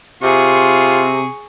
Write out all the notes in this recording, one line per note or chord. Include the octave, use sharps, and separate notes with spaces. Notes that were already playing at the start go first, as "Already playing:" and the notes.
C3 F4 G#4 C#6